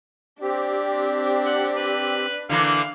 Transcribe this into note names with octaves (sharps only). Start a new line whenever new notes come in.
C4 D4 G4
F#5
B4
D3 E3 A#3 F5